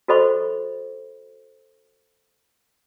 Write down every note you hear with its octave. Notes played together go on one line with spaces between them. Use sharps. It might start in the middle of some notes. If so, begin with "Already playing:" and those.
F#4 A4 C5 D#5 B5 C#6